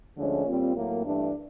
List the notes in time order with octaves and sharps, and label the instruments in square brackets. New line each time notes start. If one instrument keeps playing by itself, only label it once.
[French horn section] D2 D3 F3 G#3 C#4
A#2 G3 C4 F4
A2 F#3 A#3
G2 E3 A3 D4